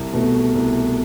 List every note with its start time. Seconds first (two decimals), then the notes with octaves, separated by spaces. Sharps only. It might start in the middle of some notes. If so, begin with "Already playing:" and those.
Already playing: C2
0.13 B2 A3
0.55 C2